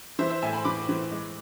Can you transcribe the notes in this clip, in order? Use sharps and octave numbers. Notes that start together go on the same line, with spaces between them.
E3 C5 E5
C5 E5
A2 E5 G#5
G#5 B5
E3 B5 D6
E3
G#3